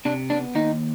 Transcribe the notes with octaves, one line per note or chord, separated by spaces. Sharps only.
C3 D4
B3 D4
D#2 D#4